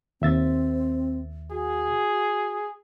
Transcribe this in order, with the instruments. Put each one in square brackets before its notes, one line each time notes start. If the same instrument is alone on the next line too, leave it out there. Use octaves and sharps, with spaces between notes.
[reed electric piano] D#2 E5 A6 [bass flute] C4
[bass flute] F#4 [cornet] G#4